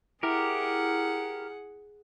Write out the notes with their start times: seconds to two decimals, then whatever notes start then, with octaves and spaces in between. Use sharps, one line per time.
0.23 E4 G4 G#4 A#4 F#5